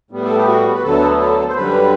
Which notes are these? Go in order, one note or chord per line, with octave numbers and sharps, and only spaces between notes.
A2 G3 B3
A4
G4
F#4
B4
D2 D3 F#3 B3 A4
A4
C5
F#2 D3 G3 B4